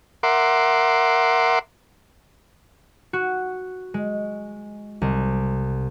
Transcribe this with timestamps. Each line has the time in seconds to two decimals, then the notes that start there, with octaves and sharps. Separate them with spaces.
0.23 A#4 E5 F#5 C6 D6
3.13 F#4
3.94 G#3
5.02 C2